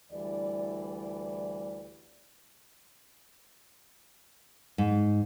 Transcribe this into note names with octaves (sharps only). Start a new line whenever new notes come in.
D2 E3 G3 D5
G#2